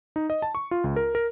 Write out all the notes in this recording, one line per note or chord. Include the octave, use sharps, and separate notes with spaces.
D#4
D#5
A5
C#6
F4
C#2
A#4
A#4